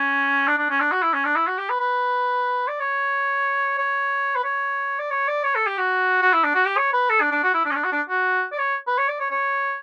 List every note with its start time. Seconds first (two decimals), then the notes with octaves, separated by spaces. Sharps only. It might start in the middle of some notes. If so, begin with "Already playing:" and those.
Already playing: C#4
0.47 D4
0.58 D4
0.70 C#4
0.80 D4
0.91 F#4
1.03 E4
1.13 C#4
1.25 D4
1.36 E4
1.47 F#4
1.58 G4
1.69 B4
1.79 B4
2.68 D5
2.80 C#5
3.78 C#5
4.35 B4
4.44 C#5
4.99 D5
5.10 C#5
5.28 D5
5.44 C#5
5.55 A4
5.66 G4
5.78 F#4
6.22 F#4
6.33 E4
6.44 D4
6.55 F#4
6.65 G4
6.77 C#5
6.93 B4
7.10 A4
7.21 D4
7.31 D4
7.43 F#4
7.54 E4
7.65 D4
7.71 C#4
7.75 D4
7.84 F#4
7.92 D4
8.09 F#4
8.52 D5
8.58 C#5
8.87 B4
8.98 C#5
9.08 D5
9.20 C#5
9.31 C#5